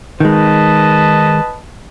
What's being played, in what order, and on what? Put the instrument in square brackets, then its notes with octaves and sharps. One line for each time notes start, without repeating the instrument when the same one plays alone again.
[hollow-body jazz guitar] D#3 G#3 [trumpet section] B4 D#5 A5